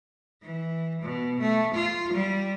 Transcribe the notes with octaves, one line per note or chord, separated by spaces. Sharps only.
E3
B2
A3
F4
G3